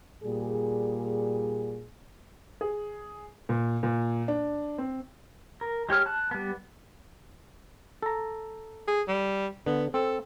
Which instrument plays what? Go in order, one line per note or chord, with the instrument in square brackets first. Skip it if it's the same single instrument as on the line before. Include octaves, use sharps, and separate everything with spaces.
[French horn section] A#2 G3 G#4
[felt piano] G#4
A#2
A#2
D4
C4
[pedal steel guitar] A#4
G#3 G4 C#5 F6
A5 F#6
G3 B3
[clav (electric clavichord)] A4 A#5
[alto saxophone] G#4
G3
[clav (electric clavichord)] D3 [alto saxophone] B3
[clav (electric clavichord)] C4 [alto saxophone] A4